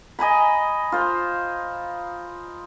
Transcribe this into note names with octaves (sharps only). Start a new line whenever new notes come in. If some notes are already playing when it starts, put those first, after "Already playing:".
D#5 G#5 A#5 B5
F4 C5